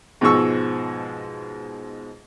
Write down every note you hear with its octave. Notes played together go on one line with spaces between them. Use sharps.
G#2 B2 F3 G#3 C#6 E6